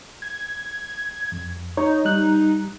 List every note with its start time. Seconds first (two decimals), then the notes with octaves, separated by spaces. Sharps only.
0.22 G#6
1.32 F2
1.77 D#4 C#5
2.05 G3 F#6